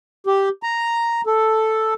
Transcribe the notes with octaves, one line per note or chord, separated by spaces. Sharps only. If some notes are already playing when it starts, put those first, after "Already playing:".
G4
A#5
A4